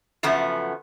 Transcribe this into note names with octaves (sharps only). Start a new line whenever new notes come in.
F#2 C#3 F3 A3 B3